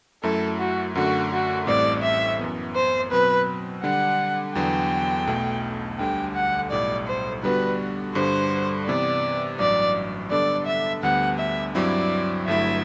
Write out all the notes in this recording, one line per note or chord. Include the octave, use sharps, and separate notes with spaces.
F#2 F#3 A3 E4 A4
F#4
F#2 D3 A3 F#4
F#4
A1 A2 G3 C4 D5
E5
F#2 E3 B3
C5
B2 F#3 C4 B4
D3 G3 D4 F#5
E2 D3 F#3 B3 G5
B1 B2 A3
D2 D3 G3 G5
F#5
B1 A2 G3 D5
C5
D3 G3 B3 D4 F#4 B4
G2 D3 G3 C5
C3 E3 B3 D5
A1 G2 F#3 D5
D3 G3 B3 D4 A4 D5
E5
D2 D3 G3 B3 F#5
E5
G2 F#3 C4 E4 D5
G1 G2 F#3 A3 E4 E5